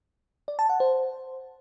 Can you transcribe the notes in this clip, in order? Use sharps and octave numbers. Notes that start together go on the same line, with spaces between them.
D5
A5
F#5
C5